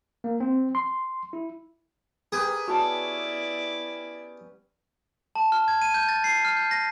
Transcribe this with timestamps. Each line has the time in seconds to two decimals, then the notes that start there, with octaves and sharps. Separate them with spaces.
0.24 A#3
0.40 C4
0.75 C6
1.33 E4
2.32 G4 G#4 A#4 B4
2.68 B3 C#4 E4 F#4 D5 A5 C#6
5.35 A5
5.52 F6
5.68 G#6
5.82 D#7
5.94 G6
6.08 A6
6.24 C7
6.45 F6
6.57 G6
6.71 A#6